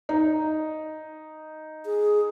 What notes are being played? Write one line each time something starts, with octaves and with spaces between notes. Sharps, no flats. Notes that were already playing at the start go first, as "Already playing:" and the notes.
D#4
G#4